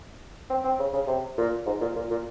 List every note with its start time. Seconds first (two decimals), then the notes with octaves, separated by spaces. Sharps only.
0.50 C4
0.64 C4
0.79 C#3
0.93 C#3
1.07 C3
1.38 A#2
1.66 G#2
1.81 A#2
1.96 A#2
2.10 A#2